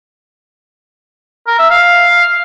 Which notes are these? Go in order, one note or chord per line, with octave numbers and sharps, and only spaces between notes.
A#4
E5
F5